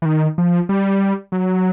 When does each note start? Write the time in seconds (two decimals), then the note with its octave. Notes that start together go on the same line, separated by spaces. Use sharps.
0.02 E3
0.05 D#3
0.38 F3
0.69 G3
1.32 F#3